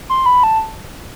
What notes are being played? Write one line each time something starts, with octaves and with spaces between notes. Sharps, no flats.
C6
B5
A5